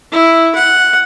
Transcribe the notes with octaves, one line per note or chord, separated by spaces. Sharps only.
E4
F#5